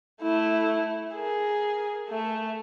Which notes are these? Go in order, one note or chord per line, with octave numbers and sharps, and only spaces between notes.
A3 E4
G#4 A#4
A3 E5